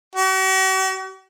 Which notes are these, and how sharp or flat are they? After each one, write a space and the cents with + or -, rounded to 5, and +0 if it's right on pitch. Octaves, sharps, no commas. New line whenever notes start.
F#4 +45